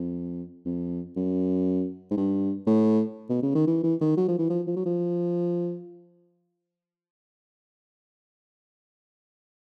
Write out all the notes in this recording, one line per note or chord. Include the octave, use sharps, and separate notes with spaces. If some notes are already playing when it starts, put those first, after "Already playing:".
Already playing: F2
F2
F#2
G#2
G2
A2
B2
C#3
D#3
E3
E3
D#3
F#3
F3
E3
F3
F3
F#3
F3